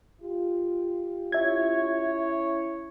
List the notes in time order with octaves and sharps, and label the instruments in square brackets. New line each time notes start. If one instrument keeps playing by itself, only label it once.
[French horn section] F4 G4
[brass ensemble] C#4 E4 C#5 [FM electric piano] E5 G#6